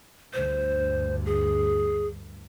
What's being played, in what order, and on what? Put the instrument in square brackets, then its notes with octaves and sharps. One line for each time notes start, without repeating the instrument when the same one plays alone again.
[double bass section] D2 G2 [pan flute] C5
[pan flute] G#4